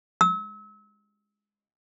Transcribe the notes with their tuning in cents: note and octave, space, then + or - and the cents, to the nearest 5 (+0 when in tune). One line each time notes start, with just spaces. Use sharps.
E6 -35